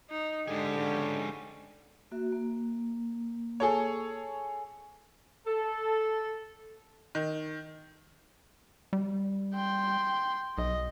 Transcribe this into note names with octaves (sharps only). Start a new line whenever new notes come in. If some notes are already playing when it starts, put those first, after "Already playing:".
D#4
G#2 D3 G4 G#4
G#2 C#4
A#3 F#4 E5
A#3
G#4 A4 C#5
A4
D#3
G3
G5 C6
B1 D#5